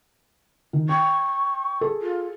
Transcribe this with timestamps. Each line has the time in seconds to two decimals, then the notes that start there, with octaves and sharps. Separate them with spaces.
0.73 D#3
0.89 G5 C#6
1.81 G#4 A4
2.02 F4